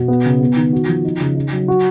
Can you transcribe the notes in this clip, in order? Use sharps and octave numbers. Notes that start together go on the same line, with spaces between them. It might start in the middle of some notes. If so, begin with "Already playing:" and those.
Already playing: B2
B3
C#3
B3
D#3
F#4
F3
D#4
C#3
D#4
F#3
F#4